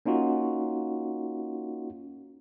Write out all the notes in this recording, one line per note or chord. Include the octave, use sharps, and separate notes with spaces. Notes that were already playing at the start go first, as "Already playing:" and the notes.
A#3 C#4 D#4 F4 F#4